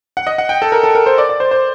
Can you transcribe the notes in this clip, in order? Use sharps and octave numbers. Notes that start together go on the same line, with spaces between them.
F#5
D#5
F#5
G5
A4
A#4
A4
A#4
C5
D5
D5
C5
C5